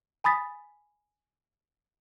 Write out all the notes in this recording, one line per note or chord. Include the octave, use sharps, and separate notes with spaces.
G#5 B5 D#6 A6 B6